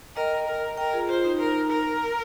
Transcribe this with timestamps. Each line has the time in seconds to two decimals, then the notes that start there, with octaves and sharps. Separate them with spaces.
0.16 A#4 D#5 G5
0.47 A#4
0.77 A#4 D#5 G5
0.93 F4 G#4
1.09 F4 C5
1.24 D#4
1.39 A#4
1.70 A#4